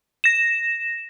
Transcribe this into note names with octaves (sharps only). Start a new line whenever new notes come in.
A#6 E7